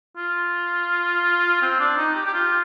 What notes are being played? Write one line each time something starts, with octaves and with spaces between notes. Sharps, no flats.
F4
C4
D4
D#4
G4
G4
F4